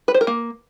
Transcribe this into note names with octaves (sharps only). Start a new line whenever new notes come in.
B4
C5
A#4
A#3